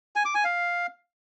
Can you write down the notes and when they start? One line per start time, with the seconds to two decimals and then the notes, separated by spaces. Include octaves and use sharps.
0.16 G#5
0.25 D6
0.35 G#5
0.44 F5